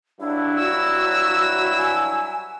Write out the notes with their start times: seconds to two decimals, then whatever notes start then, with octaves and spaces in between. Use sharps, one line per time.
0.21 G2 F#3 D4 E4
0.59 F#4 E6
1.78 G#5